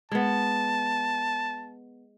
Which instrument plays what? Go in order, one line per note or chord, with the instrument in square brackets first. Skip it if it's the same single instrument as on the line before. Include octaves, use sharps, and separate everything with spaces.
[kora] G#3 B3 [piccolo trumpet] A5